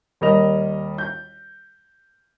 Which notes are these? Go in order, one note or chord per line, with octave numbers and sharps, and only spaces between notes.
D#2 G3 A#4 D#5 F7
G6